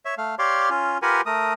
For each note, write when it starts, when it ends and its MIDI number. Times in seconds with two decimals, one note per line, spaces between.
0.05 0.15 73
0.05 0.15 76
0.18 0.35 57
0.18 0.35 77
0.39 0.70 67
0.39 0.70 73
0.39 0.70 74
0.39 0.70 77
0.39 0.70 84
0.70 0.98 61
0.70 0.98 65
1.02 1.21 65
1.02 1.21 67
1.02 1.21 70
1.02 1.21 71
1.02 1.21 78
1.02 1.21 80
1.26 1.53 57
1.26 1.53 70
1.26 1.53 87